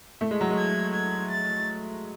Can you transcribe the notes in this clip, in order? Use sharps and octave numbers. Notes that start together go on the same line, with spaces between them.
A3
G#3
F#3
G#3
G#6
G#6
A6